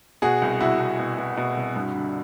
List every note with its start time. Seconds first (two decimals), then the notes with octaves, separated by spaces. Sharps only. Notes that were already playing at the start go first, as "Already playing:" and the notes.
0.22 B2 F#4 G#4
0.42 C2
0.60 C2 E4 F#4
0.80 C2
0.99 B2
1.18 B2
1.37 B2
1.57 C2
1.75 G2
1.95 D3